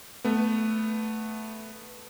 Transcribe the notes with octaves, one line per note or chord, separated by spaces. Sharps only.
A3 B3